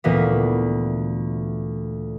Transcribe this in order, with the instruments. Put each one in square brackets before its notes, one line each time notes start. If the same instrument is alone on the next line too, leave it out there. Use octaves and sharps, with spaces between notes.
[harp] D2 A#2 E3 A#3 B3